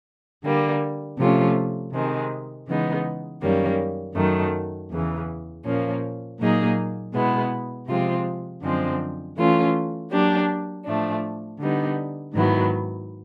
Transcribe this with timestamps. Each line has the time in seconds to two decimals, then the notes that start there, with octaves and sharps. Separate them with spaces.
0.44 D3 G3 A#3
1.18 C3 F3 A3 C#4 F4
1.92 C3 D#3 G#3 C4
2.67 C#3 E3 G#3 B3 D#4
3.41 F#2 D#3 G3 A#3 C#4
4.15 F#2 D#3 F#3 A3
4.90 E2 C#3 E3
5.65 A#2 F3 A#3 C#4
6.39 A#2 F#3 A#3 D#4 G#4
7.13 B2 G#3 B3 E4
7.88 C3 F3 G#3 C4 F4
8.62 F#2 D3 F3 G#3 C4
9.37 E3 A3 C#4 F4
10.11 F#3 A#3 D4 G4
10.85 A2 F3 A3 D4
11.60 D3 G3 B3 D#4
12.34 G#2 D#3 F#3 B3 E4